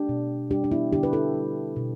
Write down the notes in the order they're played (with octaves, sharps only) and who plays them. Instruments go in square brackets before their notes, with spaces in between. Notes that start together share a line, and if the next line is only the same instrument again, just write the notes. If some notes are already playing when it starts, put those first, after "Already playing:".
Already playing: [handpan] A3 D4 G4
B2
G3 D4 G4
D4
B3 E4
D3 D4 G4
B4
E4 A4
G3
B2